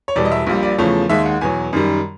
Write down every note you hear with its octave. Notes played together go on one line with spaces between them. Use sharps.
C#5
E1 E2 B2 G3 D5
D#5
E5
A#1 A#2 G3
D5
E2 C#3 F3 A3 C#5
D#2 D#3 G#3 E5
F#5
E2 B2 F#3 G#5
F#2 D#3 G3